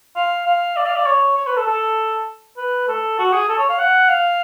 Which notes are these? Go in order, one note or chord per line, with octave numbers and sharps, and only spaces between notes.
F5
F5
D5
F5
D5
C#5
C#5
B4
A4
A4
B4
A4
F#4
G#4
A4
C#5
F5
F#5
F5